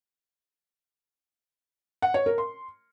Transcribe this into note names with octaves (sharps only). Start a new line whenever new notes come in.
F#5
C#5
A#4
C6